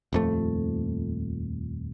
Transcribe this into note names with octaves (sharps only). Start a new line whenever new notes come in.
D#1 F2 A3